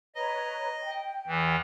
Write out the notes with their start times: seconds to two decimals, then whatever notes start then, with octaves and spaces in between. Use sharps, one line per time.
0.15 B4 C#5 D#5 A#5
0.82 G5
1.27 E2 E3